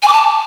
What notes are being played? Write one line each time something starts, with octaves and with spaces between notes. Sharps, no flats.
G#5
D6
A5